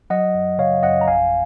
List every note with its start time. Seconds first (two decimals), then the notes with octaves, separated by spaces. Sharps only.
0.10 F#3 D#5 F#5
0.34 F#2
0.58 C#3 C#5 F5
0.83 F#2 D#5 F#5
1.01 A#5
1.07 A#1 F5 G#5